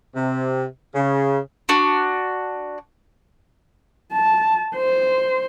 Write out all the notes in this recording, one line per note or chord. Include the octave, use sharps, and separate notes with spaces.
C3
C#3
D4 F#4
A5
C5